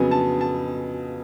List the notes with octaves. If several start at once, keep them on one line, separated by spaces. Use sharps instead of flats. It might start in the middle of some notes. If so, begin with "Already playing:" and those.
Already playing: F2 C#3 F#3 B3 G#5
A5
A5